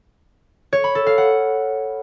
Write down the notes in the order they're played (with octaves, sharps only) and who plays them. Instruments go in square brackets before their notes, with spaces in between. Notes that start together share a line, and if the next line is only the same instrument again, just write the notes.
[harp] C#5
B5
A4
F5
F#5